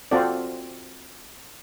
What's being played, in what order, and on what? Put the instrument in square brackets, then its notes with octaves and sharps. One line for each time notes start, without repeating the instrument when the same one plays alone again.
[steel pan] C4 F4 F#4 A4 D5